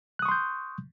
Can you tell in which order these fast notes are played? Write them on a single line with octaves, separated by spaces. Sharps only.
F#6 D#6 C#6 C6 G6